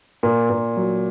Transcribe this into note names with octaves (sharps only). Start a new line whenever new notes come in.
A#2
A#2
F#3